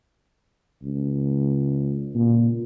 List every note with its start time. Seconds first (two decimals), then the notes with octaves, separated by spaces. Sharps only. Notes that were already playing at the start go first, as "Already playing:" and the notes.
0.83 C#2
2.14 A#2